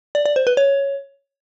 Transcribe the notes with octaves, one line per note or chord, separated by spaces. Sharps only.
D5
D5
C5
B4
C#5